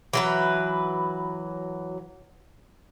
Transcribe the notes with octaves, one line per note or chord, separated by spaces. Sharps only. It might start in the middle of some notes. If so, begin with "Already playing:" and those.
E3 F#3 B4